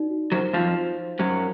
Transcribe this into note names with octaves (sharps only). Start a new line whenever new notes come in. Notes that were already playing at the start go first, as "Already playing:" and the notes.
Already playing: D#4 F#4 D5
F#4
F#2 F#3 C5
F2 F3 F5
C5
C5
F#2 F#3 C5